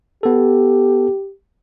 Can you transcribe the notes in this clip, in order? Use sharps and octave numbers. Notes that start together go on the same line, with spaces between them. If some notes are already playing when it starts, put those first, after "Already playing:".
B3 G4 A4